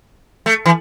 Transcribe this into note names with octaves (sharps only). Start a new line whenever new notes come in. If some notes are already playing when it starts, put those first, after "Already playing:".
A3
E3